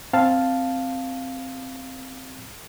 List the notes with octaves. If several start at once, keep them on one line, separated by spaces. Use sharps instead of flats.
C4 F5 A5